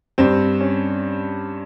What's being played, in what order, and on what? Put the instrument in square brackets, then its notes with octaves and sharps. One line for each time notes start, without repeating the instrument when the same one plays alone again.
[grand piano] G2 [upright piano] C4
[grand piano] C#4